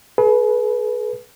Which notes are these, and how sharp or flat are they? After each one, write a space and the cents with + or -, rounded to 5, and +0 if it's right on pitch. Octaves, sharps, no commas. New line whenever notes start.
G#4 +40 B4 -20